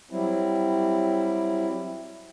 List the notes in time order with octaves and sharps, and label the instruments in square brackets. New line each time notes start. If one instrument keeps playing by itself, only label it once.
[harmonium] F#3 G3 C4 E4